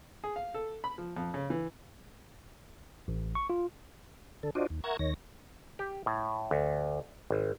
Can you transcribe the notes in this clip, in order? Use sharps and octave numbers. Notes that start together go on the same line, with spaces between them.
G#4
F5
A4
B5
F3
F2
C#3
E3
A1
C#6
F4
D3 A4
D4 F4 F#4 C5 D5 D#5
D#2
A#4 E5 F#5 A#5 C#6 G#6
D#2 D#3 C#5 A#6
G4
A2
D2
G#1